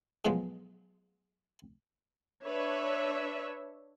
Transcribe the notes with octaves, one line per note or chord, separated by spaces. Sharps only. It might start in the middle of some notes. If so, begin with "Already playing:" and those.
G#2 B2 F3 F#3 G#3
D4 B4 C#5 E5